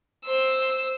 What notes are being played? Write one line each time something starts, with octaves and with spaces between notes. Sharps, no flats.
C5 E6